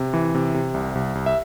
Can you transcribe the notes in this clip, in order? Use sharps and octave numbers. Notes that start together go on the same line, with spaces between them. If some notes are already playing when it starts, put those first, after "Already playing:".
Already playing: C3
E3
C3
C3
C2
C2
C2
E5